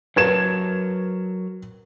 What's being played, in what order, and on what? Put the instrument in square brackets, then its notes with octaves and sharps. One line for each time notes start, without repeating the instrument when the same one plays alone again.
[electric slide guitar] F#3 A#4 A5 [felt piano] B4 G#6 E7